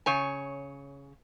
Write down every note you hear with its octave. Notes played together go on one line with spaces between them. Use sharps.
C#3 C#5 G#5